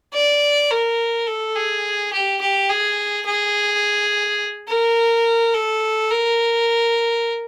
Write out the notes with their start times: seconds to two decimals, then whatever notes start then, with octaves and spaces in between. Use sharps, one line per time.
0.14 D5
0.71 A#4
1.27 A4
1.56 G#4
2.13 G4
2.41 G4
2.69 G#4
3.26 G#4
4.69 A#4
5.54 A4
6.11 A#4